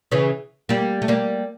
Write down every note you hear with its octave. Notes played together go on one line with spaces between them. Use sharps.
C#3 E3
G3 A#3
A3
G3 A#3